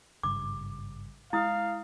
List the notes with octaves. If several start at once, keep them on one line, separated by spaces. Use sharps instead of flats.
G#1 G2 C#3 D6
G#3 E4 F5 D#6